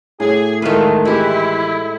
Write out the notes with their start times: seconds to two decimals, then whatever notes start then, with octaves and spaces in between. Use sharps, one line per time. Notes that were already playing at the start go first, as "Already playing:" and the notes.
0.20 A2 G#4 D6
0.62 D#3 E3 G#3 A3 F4 B4
1.05 E3 G#3 E4 G4